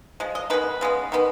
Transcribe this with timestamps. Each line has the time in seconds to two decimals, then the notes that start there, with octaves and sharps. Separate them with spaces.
0.20 F3 G#3
0.35 D#5
0.50 D#3 G#3 B3 B4
0.81 C#3 G#3 B3
1.12 D#3 G#3 B3